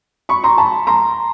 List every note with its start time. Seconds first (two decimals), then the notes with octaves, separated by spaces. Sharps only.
0.29 B5 C#6
0.44 A#5 C6
0.58 A5 B5
0.87 A#5 C6